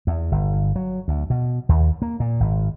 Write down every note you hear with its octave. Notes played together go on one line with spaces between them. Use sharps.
E2
G1
F#3
D2
B2
D#2
A#3
A#2
G#1